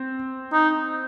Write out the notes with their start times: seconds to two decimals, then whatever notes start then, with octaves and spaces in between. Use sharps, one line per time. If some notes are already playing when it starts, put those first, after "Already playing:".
Already playing: C4
0.53 D#4